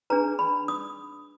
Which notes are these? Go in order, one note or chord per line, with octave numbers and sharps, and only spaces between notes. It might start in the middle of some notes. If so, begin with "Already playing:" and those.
D4 G#4 B4 A#5
B5
D#6